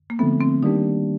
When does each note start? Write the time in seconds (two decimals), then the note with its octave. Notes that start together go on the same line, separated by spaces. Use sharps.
0.10 A#3
0.19 D3 F3 A3 B3 C4
0.41 C4
0.63 D#3 G3 A#3 D4 D#4 G4